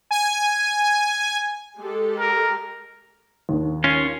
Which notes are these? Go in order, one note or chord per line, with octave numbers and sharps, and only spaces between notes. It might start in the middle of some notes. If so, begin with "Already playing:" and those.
G#5
G#3 G4 A4
A#4
D#2 D4
C#4 F4